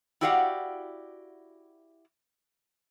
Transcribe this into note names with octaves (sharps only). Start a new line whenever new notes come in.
E4 F#4 G4 D5 F5 F#5